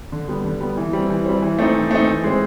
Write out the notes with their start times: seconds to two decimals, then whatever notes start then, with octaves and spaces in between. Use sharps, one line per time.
0.12 D3
0.29 G3 B3
0.45 D3
0.61 G3 B3
0.77 E3
0.93 G3 C4
1.10 E3
1.26 G3 C4
1.42 E3
1.59 A3 C4 D#4
1.74 E3
1.91 A3 C4 D#4
2.07 E3
2.24 G#3 C4